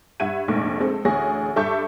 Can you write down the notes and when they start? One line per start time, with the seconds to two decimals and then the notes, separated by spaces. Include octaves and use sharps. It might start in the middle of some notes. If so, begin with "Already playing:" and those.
0.20 G2 E5 F#5 G#6 D#7
0.48 F1 A#1 G#2 A3 D6
0.80 G#3 C4 A4
1.05 A1 D2 G#4 A#6
1.56 G2 A4 E5 C#6 D6 G6